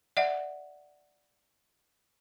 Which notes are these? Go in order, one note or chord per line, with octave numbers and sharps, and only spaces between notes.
D5 E5 F#5